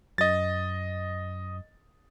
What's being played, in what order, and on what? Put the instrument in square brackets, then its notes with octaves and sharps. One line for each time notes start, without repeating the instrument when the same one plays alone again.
[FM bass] F#2 [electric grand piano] D#5 A6